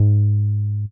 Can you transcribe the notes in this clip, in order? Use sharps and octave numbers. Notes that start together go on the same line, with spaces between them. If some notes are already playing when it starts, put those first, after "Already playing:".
Already playing: G#2